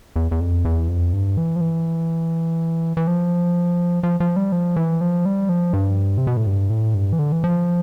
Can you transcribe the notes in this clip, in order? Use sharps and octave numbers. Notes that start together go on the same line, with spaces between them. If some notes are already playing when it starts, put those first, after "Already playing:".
E2
E2
F2
E2
F2
G2
E3
F3
E3
E3
F3
F3
F3
G3
F3
E3
F3
G3
F3
G2
C3
B2
A2
G2
A2
G2
E3
D3
E3
F3